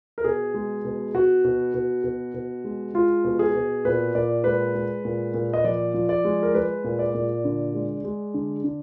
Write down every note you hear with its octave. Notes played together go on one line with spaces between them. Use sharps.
A#4
B2 G#4
G#3
B2
B2 F#4
B2
B2
B2
B2
G#3
G#3 F4
B2
G#4
B2
A#2 B4
A#2 D5
G#3 B4
G#3
A#2
A#2
D#5
F3 D5
F3
D5
G#3
A#4
G#3 B4
A#2
D5
A#2
D3
G#3
G#3
D3
D3